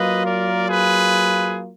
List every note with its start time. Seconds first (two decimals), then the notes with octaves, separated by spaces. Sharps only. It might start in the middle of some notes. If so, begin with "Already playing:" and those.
Already playing: F#3 A#3 F4 B4 D#5
0.25 A#4 D5
0.68 G#4 B4